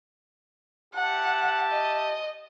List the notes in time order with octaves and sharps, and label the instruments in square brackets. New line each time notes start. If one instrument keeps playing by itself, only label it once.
[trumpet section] G4 E5 A5 [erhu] F#5
[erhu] D#5